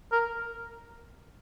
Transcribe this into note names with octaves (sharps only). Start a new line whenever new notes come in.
A#4